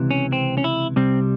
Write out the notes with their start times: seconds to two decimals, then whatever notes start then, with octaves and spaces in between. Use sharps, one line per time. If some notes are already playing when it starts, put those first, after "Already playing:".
Already playing: C#2 C3 E3
0.11 C#4
0.33 C4
0.57 C#4
0.64 E4
0.96 C2 C3 G3 C4